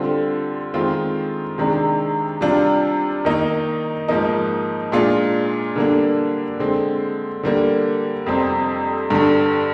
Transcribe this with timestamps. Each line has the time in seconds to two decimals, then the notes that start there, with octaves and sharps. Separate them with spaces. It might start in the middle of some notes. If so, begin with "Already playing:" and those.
Already playing: D3 G3 C4 F4
0.74 D#3 G#3 C4 F4
1.58 C3 D#3 G#3 D4
2.41 C3 G3 D4 F4
3.25 D#3 A#3 D#4
4.08 G#2 F3 A#3 D#4
4.92 A#2 G#3 D4 F4
5.76 D3 G3 A#3 D4
6.59 D3 G#3 C4
7.43 D3 G3 A#3
8.26 F2 C3 G3 C4
9.10 G2 D3 G3